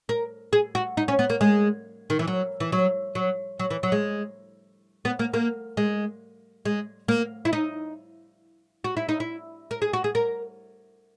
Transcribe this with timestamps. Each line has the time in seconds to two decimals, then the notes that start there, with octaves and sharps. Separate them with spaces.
0.09 A#4
0.53 G#4
0.75 F#4
0.97 D#4
1.08 C#4
1.19 B3
1.30 A#3
1.41 G#3
2.10 D#3
2.19 E3
2.28 F#3
2.60 E3
2.72 F#3
3.15 F#3
3.59 F#3
3.70 E3
3.83 F#3
3.92 G#3
5.05 B3
5.19 A#3
5.34 A#3
5.77 G#3
6.65 G#3
7.08 A#3
7.45 E4
7.53 D#4
8.84 F#4
8.97 E4
9.09 D#4
9.20 E4
9.71 A#4
9.82 G#4
9.93 F#4
10.04 G#4
10.15 A#4